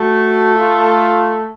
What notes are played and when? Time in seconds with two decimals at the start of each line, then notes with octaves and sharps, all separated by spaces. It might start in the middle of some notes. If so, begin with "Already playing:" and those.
Already playing: A3 F#4
0.56 F4